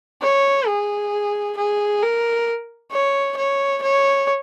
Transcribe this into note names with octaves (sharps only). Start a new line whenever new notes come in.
C#5
G#4
G#4
A#4
C#5
C#5
C#5